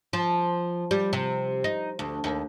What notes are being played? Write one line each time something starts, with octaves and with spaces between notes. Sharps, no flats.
F3
G3
C3
D#4
D2
D#2